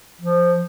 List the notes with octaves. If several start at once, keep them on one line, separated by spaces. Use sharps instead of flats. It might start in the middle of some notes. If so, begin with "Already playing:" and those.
F3